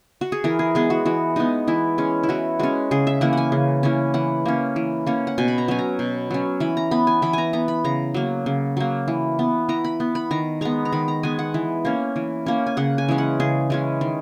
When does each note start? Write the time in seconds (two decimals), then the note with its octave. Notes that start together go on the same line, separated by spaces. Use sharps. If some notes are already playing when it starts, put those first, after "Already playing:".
0.21 F#4
0.32 G#4
0.44 E3 A#4
0.59 G#4
0.75 G#3 B3 G#4
0.90 F#4
1.05 E3 F#4
1.36 G#3 B3 D#4
1.68 E3 E4
1.98 G#3 C#4
2.23 E4
2.29 E3 F#4
2.59 G#3 C#4 F#4
2.91 C#3 G#4
3.07 E5
3.21 E3 A#3 C#4 F#5
3.33 F#5 G#5
3.52 C#3
3.83 E3 A#3 C#4
4.14 E3 F#5
4.46 A#3 C#4
4.76 E3
5.07 A#3 C#4
5.27 F#5
5.38 B2 G#5
5.48 B5
5.58 A#5
5.68 F#3 C#4 G#5
5.79 A#5
5.99 B2
6.31 F#3 C#4
6.60 E3 B5
6.77 A#5
6.91 B3 B5
7.07 G#5
7.22 E3 B5
7.33 G#5 A#5
7.53 B3 A#5
7.68 B5
7.84 C#3 A#5
8.14 F#3 A#3
8.46 C#3
8.77 F#3 A#3
9.08 E3
9.39 B3
9.69 E3 A#5
9.84 B5
10.00 B3
10.15 B5
10.31 D#3 A#5
10.61 G#3 B3 A#5
10.85 A#5
10.92 D#3 B5
11.08 A#5
11.23 G#3 B3 G#5
11.39 F#5
11.54 E3
11.85 A#3 C#4
12.16 E3
12.46 A#3 C#4
12.67 G#5
12.77 C#3 F#5
12.98 G#5
13.08 E3 G#3 C#4
13.18 F#5
13.40 C#3 G#4
13.70 E3 G#3 C#4
14.01 D#3